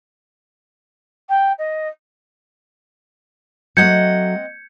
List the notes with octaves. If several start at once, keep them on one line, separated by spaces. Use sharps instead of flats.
G5
D#5
F#3 A3 C4 D#5 F#5 G6 G#6 C#7